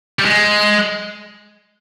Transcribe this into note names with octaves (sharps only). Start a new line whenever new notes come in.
G3
G#3